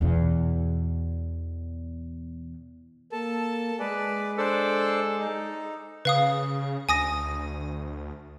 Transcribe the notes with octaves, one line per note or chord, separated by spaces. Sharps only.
E2 B2
A#3 A4 A5
G#3 G#4 B4 D5
D4 A4 C5 D5
D#4
C#3 B4 F5 D#6
D2 G#5 D#6 A#6